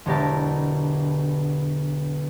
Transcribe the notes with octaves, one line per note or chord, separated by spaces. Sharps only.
E1 B1 D3 G4 A#4 A5